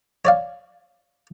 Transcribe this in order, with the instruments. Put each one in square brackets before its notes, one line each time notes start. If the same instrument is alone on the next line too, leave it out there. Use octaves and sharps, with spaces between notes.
[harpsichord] C#5 D5 F5